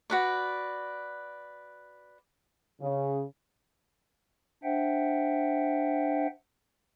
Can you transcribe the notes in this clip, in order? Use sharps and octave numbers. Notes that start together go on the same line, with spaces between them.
F#4 B4 D5
C#3
D4 C5 E5 F#5 G5